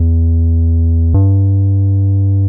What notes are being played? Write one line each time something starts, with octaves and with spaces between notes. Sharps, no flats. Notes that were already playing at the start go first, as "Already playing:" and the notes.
Already playing: E2
G2